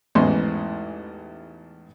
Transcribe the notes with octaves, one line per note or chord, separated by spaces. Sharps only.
A1 E2 G#2 E3 C#4 C6